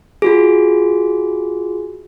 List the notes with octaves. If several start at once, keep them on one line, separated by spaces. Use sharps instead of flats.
F4 F#4 G#4